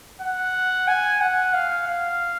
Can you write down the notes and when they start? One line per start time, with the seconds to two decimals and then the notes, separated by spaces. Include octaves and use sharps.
0.22 F#5
0.88 G#5
1.21 F#5
1.54 F5
1.87 F5